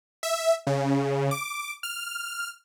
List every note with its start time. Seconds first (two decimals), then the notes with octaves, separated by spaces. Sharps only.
0.23 E5
0.67 C#3
1.31 D6
1.83 F6